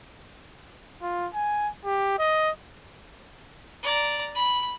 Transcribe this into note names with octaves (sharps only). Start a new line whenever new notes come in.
F4
G#5
G4
D#5
D5 A#5
B5